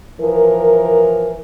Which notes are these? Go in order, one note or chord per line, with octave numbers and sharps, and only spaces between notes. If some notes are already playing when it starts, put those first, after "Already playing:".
E3 F3 A#4